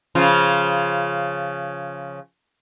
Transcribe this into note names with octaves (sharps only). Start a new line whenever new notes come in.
C#3 F3 F4